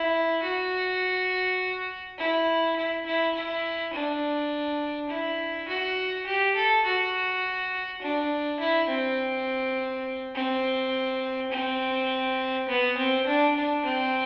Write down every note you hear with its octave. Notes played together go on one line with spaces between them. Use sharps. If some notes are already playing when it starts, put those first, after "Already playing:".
Already playing: E4
F#4
E4
E4
E4
E4
D4
E4
F#4
G4
A4
F#4
D4
E4
C4
C4
C4
B3
C4
D4
D4
C4